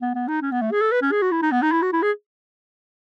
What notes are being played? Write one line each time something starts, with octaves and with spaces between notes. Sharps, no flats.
B3
B3
D#4
C#4
B3
A3
G#4
A4
B4
C#4
G#4
F#4
E4
D#4
B3
D#4
E4
F#4
E4
G#4